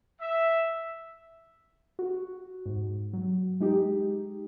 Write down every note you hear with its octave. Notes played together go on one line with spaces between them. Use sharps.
E5
F#4
G#2
F#3
G#3 D#4 G4